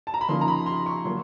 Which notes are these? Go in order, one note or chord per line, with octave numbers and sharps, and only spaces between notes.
A5
A#5
B5
C#3 F3 A#3 D#4 C6
A#5
B5
C6
C#6
F#3 A#3 C6